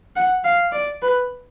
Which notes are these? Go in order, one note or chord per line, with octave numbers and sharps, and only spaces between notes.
F#5
F5
D5
B4